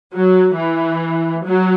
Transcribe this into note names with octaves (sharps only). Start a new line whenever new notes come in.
F#3
E3
F#3